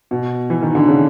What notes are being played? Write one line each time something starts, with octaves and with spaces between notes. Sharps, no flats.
B2
E3
D#3
D3
C#3